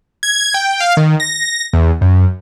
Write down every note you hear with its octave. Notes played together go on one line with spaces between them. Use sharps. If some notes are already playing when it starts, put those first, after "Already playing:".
G#6
G5
F5
D#3
A#6
E2
F#2